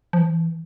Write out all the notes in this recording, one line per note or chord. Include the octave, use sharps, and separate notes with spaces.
F3
E3